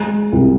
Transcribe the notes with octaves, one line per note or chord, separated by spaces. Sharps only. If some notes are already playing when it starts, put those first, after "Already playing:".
Already playing: G#3
C2